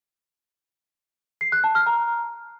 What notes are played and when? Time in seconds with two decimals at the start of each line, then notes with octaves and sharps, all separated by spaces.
1.41 C7
1.52 F#6
1.64 A5
1.75 F6
1.87 A#5